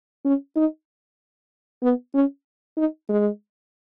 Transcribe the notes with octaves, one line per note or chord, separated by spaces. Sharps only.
C#4
D#4
B3
C#4
D#4
G#3